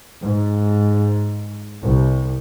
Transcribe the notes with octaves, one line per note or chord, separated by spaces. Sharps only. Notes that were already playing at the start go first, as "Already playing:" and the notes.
G#2
C2